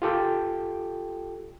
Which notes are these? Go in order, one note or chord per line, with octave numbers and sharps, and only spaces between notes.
F4 G4 A4 G5